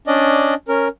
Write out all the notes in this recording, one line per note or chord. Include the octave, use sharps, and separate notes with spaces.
C#4 D4 D5 D#5
C#4 A#4